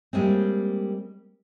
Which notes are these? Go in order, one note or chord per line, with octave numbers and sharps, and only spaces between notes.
G3 G#3 A#3 C4